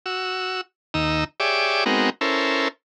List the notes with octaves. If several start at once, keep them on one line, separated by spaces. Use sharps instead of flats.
F#4 E6
D#2 D#4 A#5 E6
G4 G#4 C#5 D5 E5 D6
G#3 B3 C4 D#4 F#4 A#4
C#4 E4 A4 A#4 C5